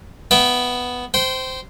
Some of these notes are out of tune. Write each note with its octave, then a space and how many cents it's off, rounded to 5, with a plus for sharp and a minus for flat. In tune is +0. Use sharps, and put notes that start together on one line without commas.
B3 +0 E5 +0 G5 +0
C5 -10 G5 -20